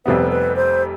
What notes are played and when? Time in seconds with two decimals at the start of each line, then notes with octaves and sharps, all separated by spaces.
0.05 F1 F2 C3 G3 B3 B4
0.31 B4
0.56 C5